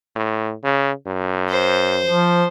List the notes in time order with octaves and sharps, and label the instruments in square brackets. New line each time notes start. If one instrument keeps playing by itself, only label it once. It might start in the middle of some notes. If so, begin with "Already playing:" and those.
[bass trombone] A2
C#3
F#2
[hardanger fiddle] C5
[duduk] F3